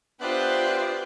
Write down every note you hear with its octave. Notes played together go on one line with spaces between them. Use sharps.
B3 D4 F4 G4 C5 D5 E5 F#6